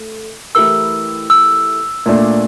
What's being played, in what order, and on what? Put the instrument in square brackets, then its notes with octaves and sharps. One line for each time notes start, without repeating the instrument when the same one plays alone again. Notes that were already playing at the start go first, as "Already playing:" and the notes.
Already playing: [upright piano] A3
[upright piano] E3 A3 E4 G4 A#4 [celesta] E6
[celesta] E6
[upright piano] A#2 A3 D4